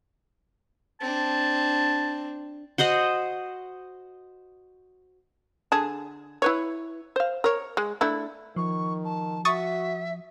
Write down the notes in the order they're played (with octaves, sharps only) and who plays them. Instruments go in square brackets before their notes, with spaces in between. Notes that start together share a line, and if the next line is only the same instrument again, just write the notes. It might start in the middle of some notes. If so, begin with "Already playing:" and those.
[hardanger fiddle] C4 D4 [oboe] A5
[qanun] F#4 C5 D#5 F#5
[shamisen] D3 G#4 A5
E4 B4 C#5
C5 F5
A#4 C#5
G#3
A3 D4 E4
[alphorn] D#3 [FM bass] F3 [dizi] C#6
[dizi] A5
[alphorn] F#4 [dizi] E5 [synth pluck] C#6 D#6 A6